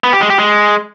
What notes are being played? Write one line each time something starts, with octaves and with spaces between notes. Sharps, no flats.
B3
G4
G#3
G4
G#3